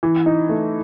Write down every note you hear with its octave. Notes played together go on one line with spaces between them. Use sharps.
E3
D#4
A3